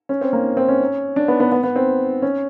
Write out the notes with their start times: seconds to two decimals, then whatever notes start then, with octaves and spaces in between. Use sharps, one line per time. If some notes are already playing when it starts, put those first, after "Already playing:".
0.09 C#4
0.21 C4
0.33 A#3
0.57 C4
0.69 C#4
1.16 D4
1.28 B3
1.40 B3
1.52 B3
1.63 B3
1.76 C4
2.22 C#4